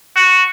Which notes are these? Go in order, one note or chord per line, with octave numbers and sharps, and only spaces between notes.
F#4